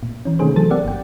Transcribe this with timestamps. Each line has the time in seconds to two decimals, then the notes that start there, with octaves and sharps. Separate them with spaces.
0.03 A#2
0.25 E3 C#4
0.39 C3 D#3 A3 C#4 G#4 C5
0.56 E3 F#3 A4 A6
0.70 A#3 C4 G4 D5 F#5
0.85 G1 G5